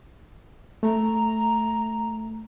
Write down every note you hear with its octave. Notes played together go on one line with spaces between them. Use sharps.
A3 A#5